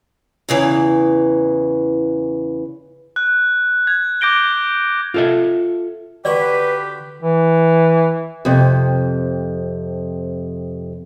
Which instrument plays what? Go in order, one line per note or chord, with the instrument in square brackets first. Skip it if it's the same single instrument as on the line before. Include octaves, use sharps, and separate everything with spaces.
[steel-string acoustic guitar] E2 C#3 E3
[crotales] F#6
G#6
D6 G6 A#6 D7 G7
[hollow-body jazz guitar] F4 A4 E5
[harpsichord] D3 F#4 [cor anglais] G4 [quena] B4 [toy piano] D5
[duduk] E3
[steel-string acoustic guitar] F2 C3